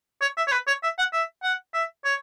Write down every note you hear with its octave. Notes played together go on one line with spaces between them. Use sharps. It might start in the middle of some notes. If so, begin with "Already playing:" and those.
C#5
E5
C#5
B4
C#5
E5
F#5
E5
F#5
E5
C#5